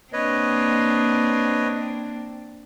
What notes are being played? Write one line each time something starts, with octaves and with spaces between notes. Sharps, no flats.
A#3 C4 D4 B4 C#5 D#5